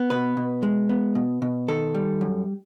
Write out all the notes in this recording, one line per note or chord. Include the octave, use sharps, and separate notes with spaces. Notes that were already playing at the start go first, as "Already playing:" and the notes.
Already playing: B3
B2 B4
B2
G#3
B3
B2
B2
D#3 A4
G3
F#2